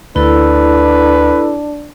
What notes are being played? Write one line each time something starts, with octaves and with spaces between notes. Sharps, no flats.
D2 D4 E4 A4 B4 E6